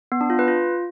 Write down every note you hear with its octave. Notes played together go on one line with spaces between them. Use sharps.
B3
D4
F4
B4
F4